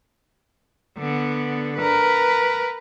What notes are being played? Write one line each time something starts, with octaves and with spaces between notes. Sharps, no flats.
D3 B3
A#4 B4